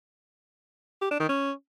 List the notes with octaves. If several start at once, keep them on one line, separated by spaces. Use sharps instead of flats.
G4
D4
D#3
C#4